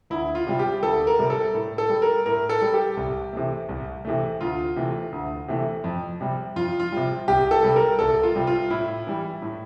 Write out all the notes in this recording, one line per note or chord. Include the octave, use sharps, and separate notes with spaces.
D2 E4
F4
C3 G3
G4
D2 A4
A#4
C3 G3
A4
A2
A4
G3
A#4
A2 A#4
A4
G3
G4
C2
C3 E3 A3
C2
C3 E3 A3
D2 F4
C3 E3 A3
D2
C3 E3 A3
F2
C3 G3
F2 F4
F4
C3 G3
C2 G4
A4
C3 G3
A#4
C2 A4
F4
C3 G3
F4
A2 E4
E3 G3
A2